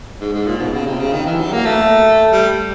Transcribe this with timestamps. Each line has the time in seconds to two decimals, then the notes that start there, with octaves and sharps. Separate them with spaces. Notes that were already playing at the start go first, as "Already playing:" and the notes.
0.21 G#2
0.33 G#2
0.47 A#2
0.61 B2
0.73 C#3
0.86 C3
1.00 C#3
1.13 D#3
1.26 E3
1.39 F#3
1.53 A#3
1.66 A3
2.32 G3